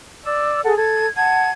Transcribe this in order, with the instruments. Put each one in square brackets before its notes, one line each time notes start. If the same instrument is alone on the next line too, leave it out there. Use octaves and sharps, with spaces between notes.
[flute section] D5 E6
G#4 A4 F#5
A4 G#6
F#5 A5 G#6